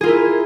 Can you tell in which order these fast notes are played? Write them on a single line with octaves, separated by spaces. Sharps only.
G#4 F4 A#4 E4